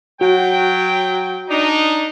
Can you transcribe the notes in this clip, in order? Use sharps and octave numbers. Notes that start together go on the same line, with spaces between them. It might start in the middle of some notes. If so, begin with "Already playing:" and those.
F#3 F#4 G5
D4 D#4